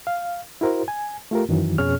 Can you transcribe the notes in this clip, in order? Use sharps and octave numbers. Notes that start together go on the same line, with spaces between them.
F5
E4 F#4 A#4 C5
G#5
A3 F4 G4 A#4
F#2 D#3 E3 F#3
F2 B2 C#4 G#4 C#5 F6